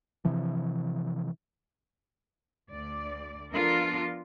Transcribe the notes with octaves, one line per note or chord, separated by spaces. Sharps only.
C3 E3 F3
D2 D5
F3 B3 D4 F4 A4 A#4